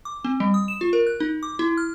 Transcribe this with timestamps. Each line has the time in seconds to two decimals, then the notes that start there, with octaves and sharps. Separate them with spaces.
0.05 D6
0.24 C4
0.40 G3
0.54 D#6
0.68 E7
0.81 F4
0.93 A#4
1.07 F#6
1.20 D#4
1.43 D6
1.59 E4
1.77 F6